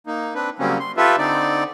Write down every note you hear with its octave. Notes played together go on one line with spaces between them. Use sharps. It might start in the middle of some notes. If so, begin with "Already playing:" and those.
A#3 D#4
C4 D4 B4
C#3 F#3 G3 A#3 C4 C#4
C6
F4 G4 A4 B4 E5
D3 C4 D#4 D5